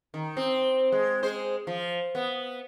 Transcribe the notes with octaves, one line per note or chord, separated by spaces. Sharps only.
D#3
C4
G#3
G#3 C5
F3
B3